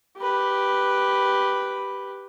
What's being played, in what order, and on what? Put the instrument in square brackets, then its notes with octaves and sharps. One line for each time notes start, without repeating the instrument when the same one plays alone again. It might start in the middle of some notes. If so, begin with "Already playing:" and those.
[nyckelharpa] G4 B4